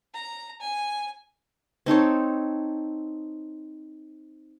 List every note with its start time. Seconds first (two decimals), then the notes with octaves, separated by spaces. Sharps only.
0.14 A#5
0.61 G#5
1.86 C4 D#4 A4 C#5